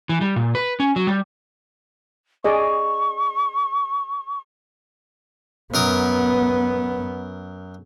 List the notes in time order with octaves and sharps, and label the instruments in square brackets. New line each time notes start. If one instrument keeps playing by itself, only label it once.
[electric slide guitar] E3
G3
A#2
B4
C#4
F#3
G3
[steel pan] G#4 D5 D#5 [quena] C#6
[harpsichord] F#2 A#4 D#6 [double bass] B3